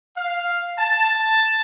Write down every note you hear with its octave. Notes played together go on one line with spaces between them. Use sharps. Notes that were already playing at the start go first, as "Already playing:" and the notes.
F5
A5